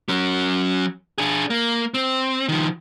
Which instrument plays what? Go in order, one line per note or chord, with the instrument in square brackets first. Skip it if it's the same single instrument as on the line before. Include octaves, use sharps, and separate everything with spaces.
[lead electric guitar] F#3 C#4
D4 G#4
A#3
C4
D#3 F3